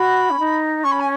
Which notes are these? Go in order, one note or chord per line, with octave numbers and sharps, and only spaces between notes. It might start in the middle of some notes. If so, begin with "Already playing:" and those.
Already playing: F#4 B5
C#4
D#4
C#4 C#6
B5
G#5